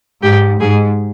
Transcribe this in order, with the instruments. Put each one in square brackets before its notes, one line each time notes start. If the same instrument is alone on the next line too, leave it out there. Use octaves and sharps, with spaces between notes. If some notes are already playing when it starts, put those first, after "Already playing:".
[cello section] G#2 [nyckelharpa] G4
[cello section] G#2 [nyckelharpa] G#4